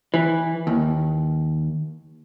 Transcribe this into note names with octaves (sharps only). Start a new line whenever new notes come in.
E3
D#2